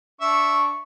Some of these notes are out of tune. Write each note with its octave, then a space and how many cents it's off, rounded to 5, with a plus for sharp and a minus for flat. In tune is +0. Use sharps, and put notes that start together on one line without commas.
D4 -20 E5 +0 C#6 -5